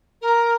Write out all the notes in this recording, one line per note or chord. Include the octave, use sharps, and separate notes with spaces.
A#4